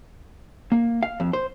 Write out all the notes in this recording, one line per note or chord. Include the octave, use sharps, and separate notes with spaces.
A#3
F5
F2
C5